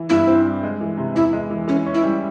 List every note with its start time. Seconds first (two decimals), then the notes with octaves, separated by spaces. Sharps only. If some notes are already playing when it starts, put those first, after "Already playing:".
Already playing: E3
0.09 G2 E4
0.27 C4
0.45 G3
0.63 G#3
0.81 E3
0.97 C3
1.15 E2 E4
1.33 G#3
1.50 E3
1.68 E3 C#4
1.86 C#4
1.94 E4
2.04 G3